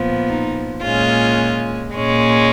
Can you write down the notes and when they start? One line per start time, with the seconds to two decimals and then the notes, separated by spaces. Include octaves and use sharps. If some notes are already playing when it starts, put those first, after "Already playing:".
Already playing: A#2 F3 B3
0.29 D#4
0.83 A#2 G#3 C#4 F4
1.95 A#2 G#3 C#4